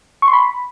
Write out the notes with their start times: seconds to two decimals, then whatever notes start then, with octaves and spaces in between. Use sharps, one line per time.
0.22 C#6
0.28 C6
0.33 B5